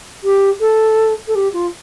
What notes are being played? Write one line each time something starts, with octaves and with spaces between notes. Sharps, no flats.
G4
A4
A4
G4
F4